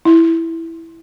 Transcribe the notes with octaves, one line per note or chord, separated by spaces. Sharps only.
E4